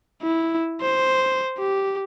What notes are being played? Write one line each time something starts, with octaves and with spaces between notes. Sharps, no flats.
E4
C5
G4